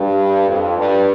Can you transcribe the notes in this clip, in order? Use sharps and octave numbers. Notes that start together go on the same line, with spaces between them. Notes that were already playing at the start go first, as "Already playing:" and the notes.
Already playing: G2
F2
G2